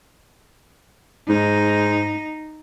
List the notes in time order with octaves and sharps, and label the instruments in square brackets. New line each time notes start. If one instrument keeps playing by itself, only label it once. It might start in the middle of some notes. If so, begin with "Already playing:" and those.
[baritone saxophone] G#2 [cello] D#4